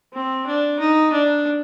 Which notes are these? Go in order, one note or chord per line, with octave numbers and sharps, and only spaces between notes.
C4
D4
D#4
D4